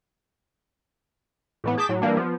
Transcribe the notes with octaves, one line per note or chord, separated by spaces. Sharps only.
A2 E3 B3
G#4 A5 D6 G6 B6 E7
A2 F#3
E3 G3 A#3 D4
F3 B3